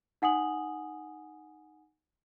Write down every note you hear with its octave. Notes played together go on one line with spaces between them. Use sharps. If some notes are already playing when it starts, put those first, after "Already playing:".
D#4 F#5 G#5 D#6 F#7